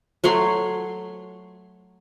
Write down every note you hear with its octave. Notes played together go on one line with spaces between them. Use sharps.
F#3 A3 C#5 C6